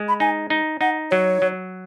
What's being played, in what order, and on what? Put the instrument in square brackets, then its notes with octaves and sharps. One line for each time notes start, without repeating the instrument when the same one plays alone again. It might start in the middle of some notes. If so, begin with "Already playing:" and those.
Already playing: [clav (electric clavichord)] G#3
[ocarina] B5
[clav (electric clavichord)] D#4 [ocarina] G#5
[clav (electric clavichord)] D#4
[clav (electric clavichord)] D#4 [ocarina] F#5
[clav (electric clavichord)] F#3 [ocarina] C#5
[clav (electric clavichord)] F#3